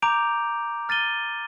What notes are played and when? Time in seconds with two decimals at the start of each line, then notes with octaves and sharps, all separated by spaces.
0.02 A#5 D6 G6 D7 F7
0.89 F6 A6 D#7 G7